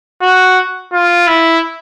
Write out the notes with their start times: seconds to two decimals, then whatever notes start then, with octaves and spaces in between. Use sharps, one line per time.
0.22 F#4
0.93 F4
1.27 E4